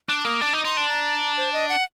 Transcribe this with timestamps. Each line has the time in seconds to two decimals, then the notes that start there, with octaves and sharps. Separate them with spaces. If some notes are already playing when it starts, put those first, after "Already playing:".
0.08 D4 F#6
0.20 D6
0.25 A#3 D#6
0.41 D4 D6
0.53 D#4
0.65 D#4 C6
0.77 D4
0.89 A#5
1.37 C5
1.53 D#5
1.69 F#5